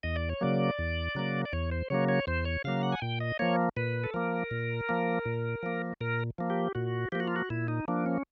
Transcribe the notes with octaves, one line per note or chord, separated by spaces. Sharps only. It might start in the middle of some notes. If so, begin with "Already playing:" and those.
E2 D#5
D5
C#5
C#3 F#3 A#3 D5
E2
C#3 F#3 A#3
D5
E2 C#5
C5
C#3 F#3 A#3 C#5
C#5
E2 C5
C#5
C#3 F#3 A#3 F5
F#5
G#5
A#2 G5
D#5
F3 A#3 C#5
A#2 B4
A4
F3 A#3 A#4
A#2
F3 A#3
A#2
F3 A#3
A#2 A#4
F3 A#3
G4
A#2 F#4
F3 A#3 G4
F#4
F4
F#4
A#2 E4
D#4
F3 A#3 D4
C#4